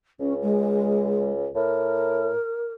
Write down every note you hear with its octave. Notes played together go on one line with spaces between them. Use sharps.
C#2 C#4
G#3
A2 A#4